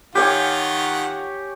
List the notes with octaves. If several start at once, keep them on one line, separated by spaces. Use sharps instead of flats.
D#3 F4 G4 C#5 F#5 G#5